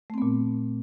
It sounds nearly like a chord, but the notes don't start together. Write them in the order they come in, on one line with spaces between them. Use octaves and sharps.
A3 C4 B3 A#2